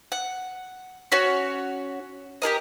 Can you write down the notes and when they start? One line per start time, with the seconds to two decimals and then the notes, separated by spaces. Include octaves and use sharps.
0.12 F#5
1.12 C#4 F#4 C#5
2.42 G4 G#4 A#4 D#5